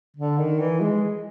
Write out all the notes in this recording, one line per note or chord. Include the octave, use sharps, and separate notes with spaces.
D3
D#3
E3
G#3